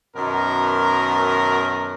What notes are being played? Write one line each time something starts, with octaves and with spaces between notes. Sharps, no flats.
F#2 B2 D#3 A#4